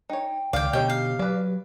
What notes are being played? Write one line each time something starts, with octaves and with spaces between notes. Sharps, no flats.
D#4 C#5 G5
C#2 D#3 D5 F5 G5
B2 D3 D#4 G4 C#5 D#5 G5
F5
F#3 B4 D5